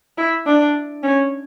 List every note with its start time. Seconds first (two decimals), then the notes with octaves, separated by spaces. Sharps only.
0.18 E4
0.46 D4
1.03 C#4